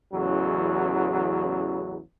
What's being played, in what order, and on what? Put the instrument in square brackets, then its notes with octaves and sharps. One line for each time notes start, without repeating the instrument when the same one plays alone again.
[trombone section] A1 E2 C#3 F#3